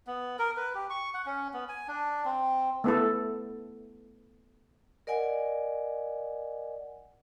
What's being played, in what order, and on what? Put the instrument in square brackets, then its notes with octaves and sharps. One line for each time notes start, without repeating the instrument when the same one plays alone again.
[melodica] B3
A#4
B4
G4
C#6
F#5
C#4
B3
G#5
D4
C4
[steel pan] A3 B3 E4 A4
[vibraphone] A#4 D5 D#5 F#5 G#5